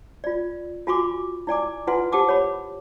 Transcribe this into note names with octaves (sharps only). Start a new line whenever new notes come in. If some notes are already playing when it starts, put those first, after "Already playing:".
F4 D5
F4 F#4 G#5 B5 C#6 D6
E4 D5 G#5 D6
E4 F4 B4 F#5 G#5 C6
G4 C5 F#5 A5 D6 D#6
C#5 F#5 B5